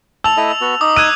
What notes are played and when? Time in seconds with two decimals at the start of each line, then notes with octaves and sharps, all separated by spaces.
0.24 A5 E6 F7
0.37 A3 E4 D#5
0.61 B3 F#4
0.81 D#4 D6 D#6
0.96 E6 F#6 G#6 D#7